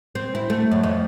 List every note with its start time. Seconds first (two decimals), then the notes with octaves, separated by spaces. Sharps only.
0.15 C4
0.35 E4
0.50 A3
0.71 F#2
0.83 F2